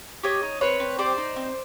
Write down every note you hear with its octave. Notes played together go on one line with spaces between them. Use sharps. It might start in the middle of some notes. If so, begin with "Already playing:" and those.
G4 C#5 D#5
D#4
C4 B4 C#5
C4
G4 C5 D5
D#4
C4